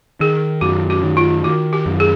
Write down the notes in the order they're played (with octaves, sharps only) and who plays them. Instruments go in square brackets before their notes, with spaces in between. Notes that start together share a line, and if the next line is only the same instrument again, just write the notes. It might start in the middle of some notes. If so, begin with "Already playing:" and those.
[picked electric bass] D#3 [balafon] G#4
[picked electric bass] F#2 [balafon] F#4
[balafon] F#4
[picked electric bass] D#3
[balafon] F4
[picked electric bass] D#3 [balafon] F#4
[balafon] G4
[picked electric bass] F#2
[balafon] G#4